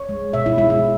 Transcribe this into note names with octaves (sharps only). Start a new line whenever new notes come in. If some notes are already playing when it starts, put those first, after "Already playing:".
Already playing: C#5
G#3
B2 E5
E4
G#3 E4
E4